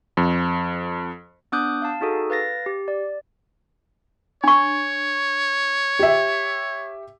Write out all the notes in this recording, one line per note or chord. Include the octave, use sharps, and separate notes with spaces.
F2
B3 D4 D6 D#6 F#6 G6
F5 A5
D#4 F#4 G#4 A4
B4 F5 A6 A#6
G4
D5
D4 C#5 C#6
G4 E5